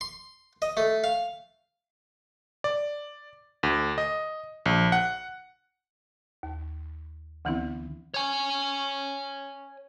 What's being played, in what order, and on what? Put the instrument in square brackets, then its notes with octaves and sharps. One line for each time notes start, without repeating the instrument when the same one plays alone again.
[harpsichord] C6
D#5
A3
F5
[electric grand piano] D5
D2
D#5
A#1
F#5
[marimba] D#2
D2 D3 E3 B3 C4 E4
[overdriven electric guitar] C#5 G#5